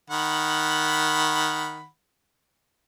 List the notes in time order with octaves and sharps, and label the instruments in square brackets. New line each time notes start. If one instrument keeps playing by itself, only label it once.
[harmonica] D#3 F#5 B5